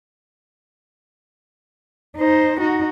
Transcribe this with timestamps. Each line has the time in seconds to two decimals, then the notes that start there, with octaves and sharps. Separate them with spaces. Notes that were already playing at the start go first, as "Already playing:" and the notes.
2.17 D#4 C5
2.60 D#4 F#4